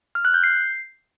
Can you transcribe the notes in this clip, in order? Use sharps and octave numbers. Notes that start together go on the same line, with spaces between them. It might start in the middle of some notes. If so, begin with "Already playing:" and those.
F6
F#6
G6
C7